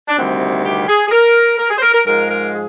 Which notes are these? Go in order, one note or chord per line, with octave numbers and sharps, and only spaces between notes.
D4
D2 C3 D#3 G3 C4
G4
G#4
G#4
A#4
A#4
G#4
C5
A#4
A#4
G#2 F3 G#3 A#4
A#4
G#4